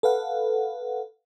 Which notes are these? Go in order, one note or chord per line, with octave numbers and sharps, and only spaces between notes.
A4 B4 F5 F#5